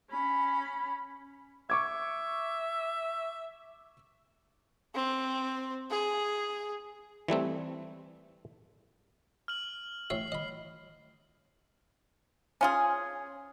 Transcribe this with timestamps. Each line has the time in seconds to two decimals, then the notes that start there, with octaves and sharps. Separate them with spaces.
0.10 C#4 B5
1.70 E5 C#6 D6 G#6
4.95 C4
5.90 G#4
7.28 E3 G3 A3 C4
9.48 F6 F#7
10.10 A1 C#5 E5 C7
10.32 D#5 B5
12.61 C#4 F4 G#4